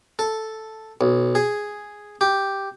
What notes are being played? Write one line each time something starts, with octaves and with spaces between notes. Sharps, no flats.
A4
B1
G#4
G4